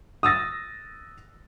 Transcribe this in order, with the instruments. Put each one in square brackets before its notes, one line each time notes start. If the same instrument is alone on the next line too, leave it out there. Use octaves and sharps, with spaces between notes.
[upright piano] D#6 E6 A6 A#6